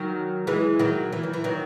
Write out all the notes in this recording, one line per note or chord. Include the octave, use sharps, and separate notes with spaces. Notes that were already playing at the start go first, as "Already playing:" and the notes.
Already playing: D#3 F#3
E3 G#3
D#3 F#3
E3
D#3
E3
D#3 F#3